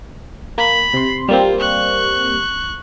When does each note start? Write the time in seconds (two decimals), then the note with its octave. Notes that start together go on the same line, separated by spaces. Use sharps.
0.58 A#3 B5
0.94 C3 C6
1.29 G3 A#3 C4 F4
1.60 C#6 F#6